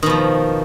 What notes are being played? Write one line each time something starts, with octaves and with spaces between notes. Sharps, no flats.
B2 D#3 F3